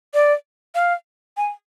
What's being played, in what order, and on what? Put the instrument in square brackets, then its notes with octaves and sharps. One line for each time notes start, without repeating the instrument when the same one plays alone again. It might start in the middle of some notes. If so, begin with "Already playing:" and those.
[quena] D5
F5
G#5